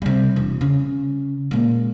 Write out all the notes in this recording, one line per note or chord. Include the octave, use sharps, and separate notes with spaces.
C3 G3
E1
C#3
A#2 G#3